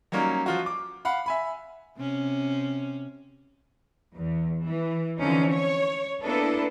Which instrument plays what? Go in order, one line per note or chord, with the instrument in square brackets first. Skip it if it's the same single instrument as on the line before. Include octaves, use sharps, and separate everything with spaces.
[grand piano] F#3 G3 A#3 C#4 D#4 A#4
F3 F4 F#4
D6
F5 F#5 B5
E5 G#5 B5
[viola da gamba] C3 C#4
[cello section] E2
E3
D3 E3 F3 C4 C#4 D#4
C#5
A#3 B3 D4 E4 A4 B4